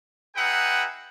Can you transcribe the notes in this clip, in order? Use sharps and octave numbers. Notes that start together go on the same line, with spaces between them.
D#4 G#4 B4 E5 F#5 G5